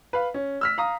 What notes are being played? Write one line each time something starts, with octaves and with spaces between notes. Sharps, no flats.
B4 F5
C#4
E6 F6 B6
F5 A#5 D#6